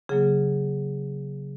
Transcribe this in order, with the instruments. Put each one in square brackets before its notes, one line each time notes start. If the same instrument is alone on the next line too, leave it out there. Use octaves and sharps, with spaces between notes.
[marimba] C#3 F#3 A#3 G#4